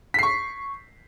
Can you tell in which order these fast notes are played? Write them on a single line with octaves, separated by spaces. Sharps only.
B6 C7 C#6